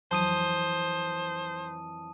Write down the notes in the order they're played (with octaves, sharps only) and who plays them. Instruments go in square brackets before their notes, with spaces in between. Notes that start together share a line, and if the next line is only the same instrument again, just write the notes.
[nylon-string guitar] F2 E3 F#3 [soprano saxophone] C5 [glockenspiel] A5 D#6 D#7